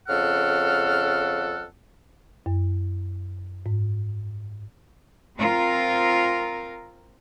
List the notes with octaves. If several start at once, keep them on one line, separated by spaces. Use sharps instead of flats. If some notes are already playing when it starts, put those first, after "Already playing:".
F2 C#3 A4 F#5 F6
F#2
G#2
C4 F4 A#4